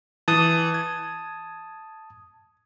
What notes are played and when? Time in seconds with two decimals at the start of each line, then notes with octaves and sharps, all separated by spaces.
0.28 E3 A5 D#6
0.74 G#6